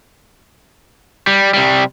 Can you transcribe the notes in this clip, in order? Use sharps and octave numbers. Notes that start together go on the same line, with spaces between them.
G3
C3 G3